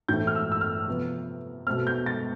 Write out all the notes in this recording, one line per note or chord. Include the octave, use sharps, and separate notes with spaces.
A2 E3 A3 C4 G6
F6
E6
E6
F6
C3 F3 B3
B2 A3 C4 F6
G6
A6